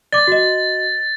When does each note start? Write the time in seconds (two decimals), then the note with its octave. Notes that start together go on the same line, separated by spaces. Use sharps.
0.13 D5 D6 A6
0.27 F#4 D#5